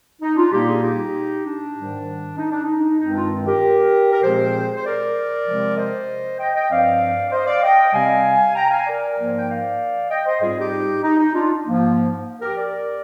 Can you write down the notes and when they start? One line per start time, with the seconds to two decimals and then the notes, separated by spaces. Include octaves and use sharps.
0.21 D#4
0.36 D4 F4
0.51 A#2 G3 A#3 D#4 G4
0.67 F4 G#4
0.82 D#4 G4
1.45 D4
1.75 G#2 D#3 G3
2.37 D#4
2.50 D4
2.63 D#4
2.99 G2 D#3 G#3 C4 D#4
3.14 D4 F4
3.46 G4 A#4
4.12 A#4
4.23 A#2 F3 G#3 C4 G#4 C5
4.75 C5
4.84 A#4 D5
5.47 C3 F3 G#3 C4
5.77 C5 D#5
6.39 D#5 G5
6.54 D#5 G5
6.70 G2 F3 C4 D5 F5
7.28 D5
7.32 C5 D#5
7.47 D5 F5
7.62 D#5 G5
7.93 C3 G3 C4 F5 G#5
8.55 G5 A#5
8.70 F5 G#5
8.86 A#4 D5
9.17 G#2 F3 A#3
9.38 G5
9.48 D5 F5
10.10 D#5 G5
10.25 C5 D#5
10.41 G#2 G3 C4 F4 G#4
10.57 D#4 G4
11.03 D#4
11.18 D#4
11.34 D4 F4
11.65 G#2 F3 A#3
12.41 G4 A#4
12.57 A#4 D5